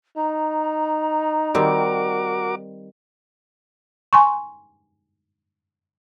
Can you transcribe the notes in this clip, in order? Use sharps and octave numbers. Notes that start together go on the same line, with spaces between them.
D#4 A#5
D#3 G3 C4 F#4 A#4 D6
G#5 C6 C#6